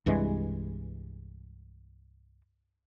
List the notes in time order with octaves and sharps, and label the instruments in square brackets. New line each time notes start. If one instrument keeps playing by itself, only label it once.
[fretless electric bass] C2 G2 E3 G#3